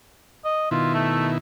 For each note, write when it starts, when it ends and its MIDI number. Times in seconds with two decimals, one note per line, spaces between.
0.45 0.66 75
0.71 1.38 47
0.71 1.38 51
0.71 1.38 64
0.71 0.94 65
0.94 1.29 57